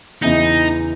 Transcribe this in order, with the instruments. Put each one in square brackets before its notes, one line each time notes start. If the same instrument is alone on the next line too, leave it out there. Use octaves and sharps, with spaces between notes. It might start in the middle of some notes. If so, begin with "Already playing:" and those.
[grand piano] E2 C#3 E3 B3 [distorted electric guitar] D#4